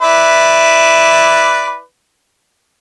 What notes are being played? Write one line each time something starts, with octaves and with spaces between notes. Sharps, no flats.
E4 B4 D5